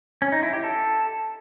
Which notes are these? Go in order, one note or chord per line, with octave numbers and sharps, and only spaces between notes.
C#4
D#4
E4
G4
A4